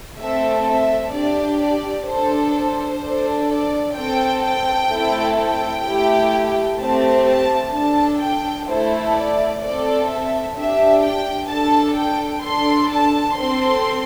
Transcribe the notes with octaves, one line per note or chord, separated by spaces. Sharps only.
A3 C4 A4 E5
E5
D4 G4 D5
D5
D4 A4 C5
C5
D4 A4
D5
C4 A4 G5
G5
A3 C4 E4 A4
G5
A3 E4 G4
A3 C4 G4 A5
A5
D4 A4 A5
G5
A3 E4 A4 C5
D5
C4 A4 D5
E5
D4 G4 E5
G5
D4 A4 A5
G5
D4 A4 C6
A5
C4 A4 C6